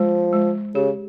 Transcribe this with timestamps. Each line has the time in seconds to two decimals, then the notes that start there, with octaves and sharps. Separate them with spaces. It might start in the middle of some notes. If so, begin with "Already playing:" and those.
Already playing: F3 G#3
0.33 G#3
0.75 C#3 G4